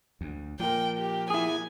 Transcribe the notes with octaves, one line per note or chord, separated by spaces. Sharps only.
D2
A#2 F3 A#4 G5
G4
E4 G#4 G#5